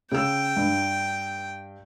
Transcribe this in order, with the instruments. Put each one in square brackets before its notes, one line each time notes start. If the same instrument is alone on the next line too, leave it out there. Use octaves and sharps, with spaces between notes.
[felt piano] C#3 E6 [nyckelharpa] G5
[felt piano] G2